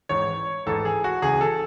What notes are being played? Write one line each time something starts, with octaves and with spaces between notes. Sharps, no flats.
A1 G#2 E3 C#5
A1 G#2 E3 A4
G#4
F#4
C#2 C#3 E3 G#4
A4